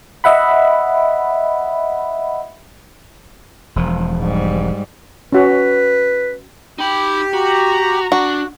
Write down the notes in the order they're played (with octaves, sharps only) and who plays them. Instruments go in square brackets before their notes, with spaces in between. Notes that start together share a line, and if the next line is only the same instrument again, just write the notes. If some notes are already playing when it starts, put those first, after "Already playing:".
[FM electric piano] D#5 E5 F#5 B5
[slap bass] E1 F3
[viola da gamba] G#2 G3
[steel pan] C#4 F#4 [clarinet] B4
[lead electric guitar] D#4 B5 [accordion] G4
[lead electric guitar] F#4 [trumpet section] A#5
[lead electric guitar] D4 [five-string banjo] F#4